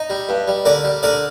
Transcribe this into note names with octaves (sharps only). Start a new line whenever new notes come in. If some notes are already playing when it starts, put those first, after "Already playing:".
Already playing: D#4
G3
G2
G3
D3 A#4 D5
G3
D3 A#4 D5